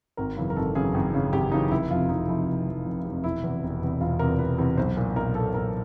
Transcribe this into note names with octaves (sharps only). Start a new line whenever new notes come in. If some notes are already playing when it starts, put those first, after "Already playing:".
G#1 A#4
F#2 C#3 E3
A#4
G#1 A4
F#2 C#3 E3 G#4
G#1
F#2 C#3 E3
G#1 G4
F#2 C#3 E3 D#4
F1 E4
F2 C3 F4
F1 D#4
F2 C3 E4
F1
F2 C3
F1
C3
F2
E1 E4
E2 C3
E1
E2 C3
E1 F4
E2 C3 A#4
E1 B4
E2 C3
B1 C5
A#2
B1 A#4
A#2 A4
B1 A#4